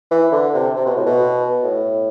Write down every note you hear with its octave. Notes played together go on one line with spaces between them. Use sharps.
E3
D3
C3
C3
B2
A2
B2
A2